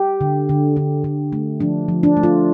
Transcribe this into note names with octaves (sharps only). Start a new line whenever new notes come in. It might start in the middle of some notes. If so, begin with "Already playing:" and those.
Already playing: G4
D3
D3
D3
D3
A3
F3 D4
F3
D4
A3
F4